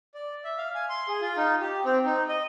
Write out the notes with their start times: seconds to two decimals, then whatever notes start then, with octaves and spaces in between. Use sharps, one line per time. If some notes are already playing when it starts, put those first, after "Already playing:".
0.14 D5
0.44 E5
0.58 F5
0.75 G#5
0.90 C6
1.08 G#4
1.21 F4
1.37 D#4
1.61 G4
1.85 C4
2.05 D#4
2.29 D#5